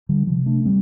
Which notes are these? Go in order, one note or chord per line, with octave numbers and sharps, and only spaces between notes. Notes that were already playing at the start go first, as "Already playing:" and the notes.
D3 G3
C3 F3
A3 D4
G3 C4